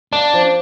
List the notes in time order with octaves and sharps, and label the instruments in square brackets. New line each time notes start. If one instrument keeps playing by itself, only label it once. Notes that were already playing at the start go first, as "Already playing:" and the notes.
[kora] A#3 [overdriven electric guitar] D4
[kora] F3